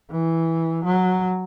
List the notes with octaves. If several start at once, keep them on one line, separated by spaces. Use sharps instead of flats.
E3
F#3